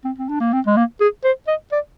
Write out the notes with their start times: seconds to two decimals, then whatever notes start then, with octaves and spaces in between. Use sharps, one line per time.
0.05 C4
0.18 C4
0.29 D4
0.40 A#3
0.53 C4
0.66 G#3
0.77 A#3
1.00 G#4
1.24 C5
1.47 D#5
1.72 D5